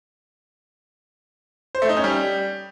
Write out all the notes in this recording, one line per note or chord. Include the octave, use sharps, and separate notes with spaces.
C5
A3
D#4
C#4
G3